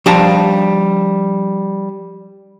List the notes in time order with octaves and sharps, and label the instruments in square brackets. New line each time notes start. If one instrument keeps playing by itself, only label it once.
[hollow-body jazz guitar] F3 G3 D4 A5 A#5